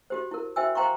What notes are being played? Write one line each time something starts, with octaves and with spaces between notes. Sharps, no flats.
F#4 G4 C5
E4 A#4
F#4 C5 E5 G5 G#5 E6
C5 F5 G5 A#5 C6 C#6